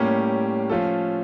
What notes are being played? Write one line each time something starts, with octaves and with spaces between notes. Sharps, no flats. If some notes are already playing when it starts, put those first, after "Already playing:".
Already playing: A2 G3 A#3 C#4 G4
F3 A3 C#4 F4 A4